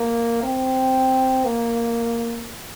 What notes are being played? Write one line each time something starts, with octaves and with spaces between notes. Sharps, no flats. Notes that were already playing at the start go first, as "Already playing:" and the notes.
Already playing: A#3
C4
A#3